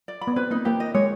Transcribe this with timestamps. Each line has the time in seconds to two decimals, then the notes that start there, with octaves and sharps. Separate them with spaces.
0.08 D5
0.21 B5
0.27 B3
0.36 C4 B4
0.51 A#3 D#4
0.65 A#3 G4
0.80 D#5
0.94 G#3 C#5